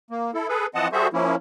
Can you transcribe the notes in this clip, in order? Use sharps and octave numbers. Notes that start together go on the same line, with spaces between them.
A#3
E4 A4
G#4 A4 B4
E3 F3 C4 D#5 F#5 A5
G3 F#4 G#4 A4 C5 E5
F3 A#3 C#4 E4